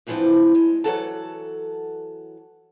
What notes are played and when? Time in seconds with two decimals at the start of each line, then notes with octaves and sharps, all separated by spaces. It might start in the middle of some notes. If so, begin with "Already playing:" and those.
0.07 D2 G2 E3 F3 C4 D4
0.55 G#3
0.84 E3 F#3 A4 F#5 A5